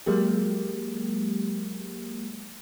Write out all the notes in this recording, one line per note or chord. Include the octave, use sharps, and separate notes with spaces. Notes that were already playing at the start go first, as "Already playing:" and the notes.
F#3 G#3 A#3 G4